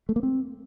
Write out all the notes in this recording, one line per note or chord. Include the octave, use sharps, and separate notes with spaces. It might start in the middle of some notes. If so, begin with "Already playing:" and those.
A3
A#3
C4